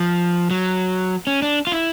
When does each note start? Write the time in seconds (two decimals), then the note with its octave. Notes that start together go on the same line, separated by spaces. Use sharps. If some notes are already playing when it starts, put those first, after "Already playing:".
Already playing: F3
0.51 F#3
1.27 C#4
1.42 D4
1.67 F4
1.72 E4